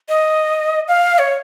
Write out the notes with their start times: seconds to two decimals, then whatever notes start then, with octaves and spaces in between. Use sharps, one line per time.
0.09 D#5
0.88 F5
1.19 C#5